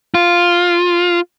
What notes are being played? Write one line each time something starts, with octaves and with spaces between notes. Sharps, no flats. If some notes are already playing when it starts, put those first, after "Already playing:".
F4